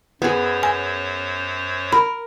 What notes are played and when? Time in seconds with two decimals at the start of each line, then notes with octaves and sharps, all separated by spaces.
0.22 F#2 B3 G#4 C5 C#5
0.63 G#5
1.93 A#4 B5